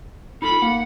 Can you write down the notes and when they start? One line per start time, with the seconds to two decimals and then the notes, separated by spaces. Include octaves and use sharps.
0.42 D#4 F4 A4 B5
0.62 A#3 F#5